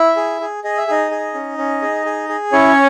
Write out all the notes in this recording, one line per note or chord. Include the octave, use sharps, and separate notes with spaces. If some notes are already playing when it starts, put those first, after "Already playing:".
Already playing: E4 E5
G#4
G#4
G#4 D#5
E5
D#4 G#4 D#5
G#4
C#4
C#4
G#4
G#4
G#4
C#4 E4 C#5